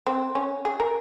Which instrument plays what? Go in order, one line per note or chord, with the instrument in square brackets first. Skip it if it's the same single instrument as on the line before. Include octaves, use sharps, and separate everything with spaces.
[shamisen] C4
C#4
G#4
A#4